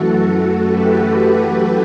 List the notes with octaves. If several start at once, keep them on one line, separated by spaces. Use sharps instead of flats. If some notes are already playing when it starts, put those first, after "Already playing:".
Already playing: F#2 E3 A3 F#4 A4
F#4 A4
G4 B4